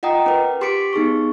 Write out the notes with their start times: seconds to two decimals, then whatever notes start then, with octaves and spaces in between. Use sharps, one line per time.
0.03 F4 D#5 F#5 G5 A#5 D#6
0.26 C#4 A#4 B4
0.61 G4 C6 D6 B6 C#7 D7
0.93 B3 D#4 G#4 C#6